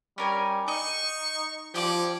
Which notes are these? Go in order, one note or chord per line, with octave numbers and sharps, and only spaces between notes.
G3 C#4 A#4 G#5
D#4 D#5 C#6
F3 C#4 G4 D5 D6